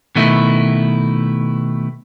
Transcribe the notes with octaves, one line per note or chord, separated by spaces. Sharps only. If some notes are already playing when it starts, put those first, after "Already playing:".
B2 D#3 A3 E4